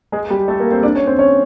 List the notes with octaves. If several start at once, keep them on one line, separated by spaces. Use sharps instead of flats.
G#3 G#4
G3 G4
A3 A4
A#3 A#4
C4 C5
D4 D5
C#4 C#5
C4 C5
C#4 C#5